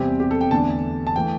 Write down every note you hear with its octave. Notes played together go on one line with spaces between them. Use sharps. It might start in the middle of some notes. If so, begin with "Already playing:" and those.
Already playing: E2 C3 G3 C4 G4
G4
A4
G5
E2 D3 A3 D4 A5
A5
E3 A3 G5